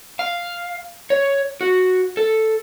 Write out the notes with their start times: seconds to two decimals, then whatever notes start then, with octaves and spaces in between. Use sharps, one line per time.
0.19 F5
1.10 C#5
1.61 F#4
2.17 A4